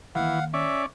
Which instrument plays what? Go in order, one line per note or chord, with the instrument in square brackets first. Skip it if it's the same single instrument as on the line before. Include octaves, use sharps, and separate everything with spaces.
[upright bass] D#3 A#3 [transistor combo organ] E3 [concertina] F5 F#5
[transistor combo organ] C#4 D5 [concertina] E5